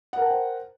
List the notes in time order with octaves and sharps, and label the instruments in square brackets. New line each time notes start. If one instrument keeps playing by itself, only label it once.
[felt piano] F#5
A#4
A5
G5
C5